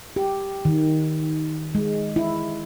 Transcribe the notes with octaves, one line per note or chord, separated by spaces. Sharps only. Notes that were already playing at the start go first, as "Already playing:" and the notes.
G4
D#3
G#3
E4